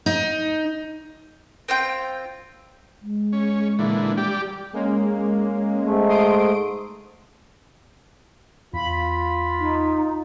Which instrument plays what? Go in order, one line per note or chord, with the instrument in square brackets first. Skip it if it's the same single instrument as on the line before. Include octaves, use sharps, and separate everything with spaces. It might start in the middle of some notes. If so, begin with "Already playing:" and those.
[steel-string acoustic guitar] D#4
[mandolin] C4 F4 G5
[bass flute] G#3
[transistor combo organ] C#4
A#2 D3 E3
G3 G4 D5
[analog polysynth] G#3 A#3 C#4
[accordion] G#2 A3
[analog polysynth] C6 D#6 D7
[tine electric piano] E2 [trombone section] F4 [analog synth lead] B5
[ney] D#4